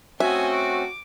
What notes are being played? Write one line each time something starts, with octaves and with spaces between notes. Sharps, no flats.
A3 C4 C#4 F#4 D#5 E5 G#5
D6